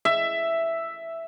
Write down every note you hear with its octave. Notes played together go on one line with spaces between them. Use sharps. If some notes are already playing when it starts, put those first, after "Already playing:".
E5